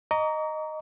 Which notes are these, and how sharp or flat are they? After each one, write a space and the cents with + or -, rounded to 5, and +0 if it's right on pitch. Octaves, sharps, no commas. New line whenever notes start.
D#5 -5 A#5 +0 C#6 +45